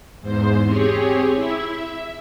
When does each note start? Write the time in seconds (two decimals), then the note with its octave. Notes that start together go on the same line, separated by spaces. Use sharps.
0.21 E2 G#2 C5
0.64 C4 G4 G#4 C#5
1.34 E4 E5
1.71 E5